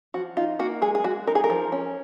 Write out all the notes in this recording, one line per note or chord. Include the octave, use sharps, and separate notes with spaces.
F3 F#4
D#4 F4
A#3 F#4
G#3 G#4
G#4
G#3 F#4
D#4 A#4
G#4
A#4
F3
C#4